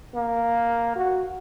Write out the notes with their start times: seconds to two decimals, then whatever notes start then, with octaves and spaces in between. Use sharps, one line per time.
0.15 A#3
0.96 F#4